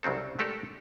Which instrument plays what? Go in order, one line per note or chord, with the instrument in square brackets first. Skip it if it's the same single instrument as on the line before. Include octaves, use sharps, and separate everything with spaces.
[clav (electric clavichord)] C2 C#3 F#3 C4 A4
G#3 A3 G4 A4 A#4 D5